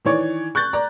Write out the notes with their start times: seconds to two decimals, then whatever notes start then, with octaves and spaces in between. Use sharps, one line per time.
0.05 D#3 E3 C#5 D5
0.55 C#6 F#6 G6 A6
0.73 D5 A#5